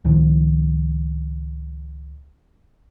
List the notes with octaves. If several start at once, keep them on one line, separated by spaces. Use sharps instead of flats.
C#2 A2 D#3 F3